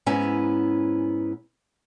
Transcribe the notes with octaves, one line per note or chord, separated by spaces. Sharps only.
G#2 B3 C#4 E4 G#5 A#5